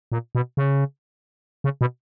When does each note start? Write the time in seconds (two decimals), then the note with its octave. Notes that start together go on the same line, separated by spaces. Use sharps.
0.12 A#2
0.35 B2
0.57 C#3
1.64 C#3
1.81 B2